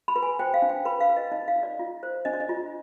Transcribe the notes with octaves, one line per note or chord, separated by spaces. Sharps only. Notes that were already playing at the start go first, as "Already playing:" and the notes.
B5
B4
G#5
C5 G5
F5
D4
G5
B4 B5
F5
B4
D#5
D#4 D#5
F5
D#4
D5
F4
C5
D4 D#5
D5
D#5
F4